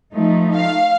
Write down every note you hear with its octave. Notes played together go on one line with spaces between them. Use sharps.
F3 A3 D#4
F5